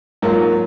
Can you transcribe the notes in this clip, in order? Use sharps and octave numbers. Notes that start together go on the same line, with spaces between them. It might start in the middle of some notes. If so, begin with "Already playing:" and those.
G#2 F#3 A#3 F4